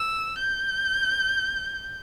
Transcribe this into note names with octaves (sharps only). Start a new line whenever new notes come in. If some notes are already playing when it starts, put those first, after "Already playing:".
Already playing: E6
G6